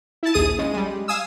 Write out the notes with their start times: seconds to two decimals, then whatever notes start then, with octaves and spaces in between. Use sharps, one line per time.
0.23 E4 A5
0.34 A#1 D#2 G#4 D#6 D#7
0.58 C#3 G#3
0.73 G3 G#3
1.08 F5 G#5 D#6 E6